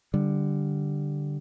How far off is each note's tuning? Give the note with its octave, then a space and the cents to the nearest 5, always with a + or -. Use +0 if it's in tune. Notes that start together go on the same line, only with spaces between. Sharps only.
D3 +0 G3 +0